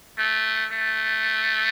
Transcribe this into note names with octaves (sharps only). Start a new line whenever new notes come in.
A3
A3